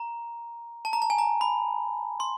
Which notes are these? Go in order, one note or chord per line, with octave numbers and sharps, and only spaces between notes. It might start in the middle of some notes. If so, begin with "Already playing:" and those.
Already playing: A#5
A5
A#5
A5
G#5
A#5
B5
C6